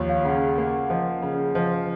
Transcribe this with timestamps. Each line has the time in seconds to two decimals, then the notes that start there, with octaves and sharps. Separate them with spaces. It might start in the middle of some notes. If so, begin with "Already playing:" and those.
Already playing: D#2 F3 F4 C#5
0.09 F5
0.25 C#3 F#5
0.58 A#3 F#5
0.90 F3 D#5
1.22 C#3
1.55 F3 D#5
1.72 F5